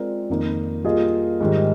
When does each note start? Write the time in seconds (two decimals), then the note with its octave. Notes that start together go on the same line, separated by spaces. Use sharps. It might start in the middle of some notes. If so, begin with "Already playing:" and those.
Already playing: G#3 C4 F4 A#4 D5
0.30 F2 D#3 A#3 D#4
0.84 G3 A#3 F4 G#4 D#5
1.41 G#2 D#3 G3